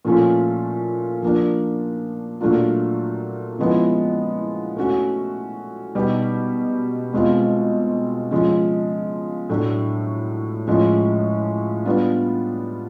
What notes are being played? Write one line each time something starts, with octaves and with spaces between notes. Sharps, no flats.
A#2 F3 A3 C#4 F4
F3 A#3 D4
A#2 F#3 A3 D4 F4
C#3 F3 G#3 B3 E4
A3 C#4 F#4
B2 G3 B3 D#4 G4
B2 G#3 C4 F4
C#3 F3 G#3
A2 F#3 A3 D4
A2 F3 G#3 C#4
G3 B3 D4 F4